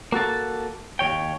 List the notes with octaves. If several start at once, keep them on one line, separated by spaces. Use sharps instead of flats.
A#3 F#4 A4 A5
D#2 D#3 C#5 G5